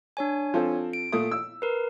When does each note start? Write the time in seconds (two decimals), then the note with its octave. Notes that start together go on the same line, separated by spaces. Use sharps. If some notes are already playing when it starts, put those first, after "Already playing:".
0.17 D4 C#5 G#5
0.54 F3 C4 A4
0.93 D7
1.13 A#2 A3 D#6
1.31 E6
1.62 A#4 B4